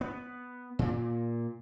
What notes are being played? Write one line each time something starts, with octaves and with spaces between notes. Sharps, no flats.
B3
A#2